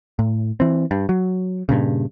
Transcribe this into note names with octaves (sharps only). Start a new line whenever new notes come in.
A2
E3 C4
G2
F#3
G2 A#2 C#3